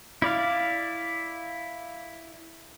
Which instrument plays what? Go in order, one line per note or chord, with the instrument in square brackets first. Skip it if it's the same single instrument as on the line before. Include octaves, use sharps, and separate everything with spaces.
[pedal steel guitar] E4 D5 F5